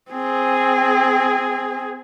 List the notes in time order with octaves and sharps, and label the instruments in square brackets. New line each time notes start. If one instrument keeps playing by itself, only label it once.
[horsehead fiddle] C4 G#4